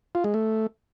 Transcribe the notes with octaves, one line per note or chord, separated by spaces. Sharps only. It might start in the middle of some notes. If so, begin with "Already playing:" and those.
F4
G#3
A3